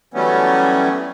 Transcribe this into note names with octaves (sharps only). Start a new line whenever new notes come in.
E3 F#3 G3 A3 B3 C#4